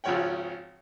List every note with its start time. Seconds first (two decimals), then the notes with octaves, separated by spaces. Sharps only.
0.04 G#1 C#3 F3 C#5 F#5 G5